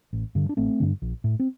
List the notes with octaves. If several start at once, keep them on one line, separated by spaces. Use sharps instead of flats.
A1
G2 D3
D4
A1 A3 C4
G2 D3
A#1
A2
C4